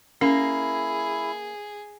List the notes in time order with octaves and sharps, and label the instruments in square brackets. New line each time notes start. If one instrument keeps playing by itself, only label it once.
[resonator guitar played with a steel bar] A#3 [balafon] C#4 [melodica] E4 [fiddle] G#4